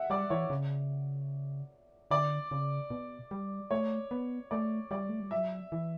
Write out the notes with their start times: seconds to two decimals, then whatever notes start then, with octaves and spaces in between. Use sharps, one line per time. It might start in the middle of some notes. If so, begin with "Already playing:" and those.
Already playing: E5 F#5
0.10 G3 D5
0.30 E3 C#5
0.50 C#3
2.11 D3 D5
2.51 C#3
2.90 B2
3.31 G3
3.71 A3 C#5
4.11 B3
4.51 A3 D5
4.91 G3 D5
5.09 A3
5.20 G3
5.31 F#3 E5
5.72 E3